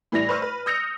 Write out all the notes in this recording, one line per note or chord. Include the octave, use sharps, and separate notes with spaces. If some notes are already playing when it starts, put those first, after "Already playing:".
A2 E3 G3 E4 A#6 F7
B4 C5 D5 C#6 E6 F6
B4
D#6 E6 G6 A#6 C#7 F7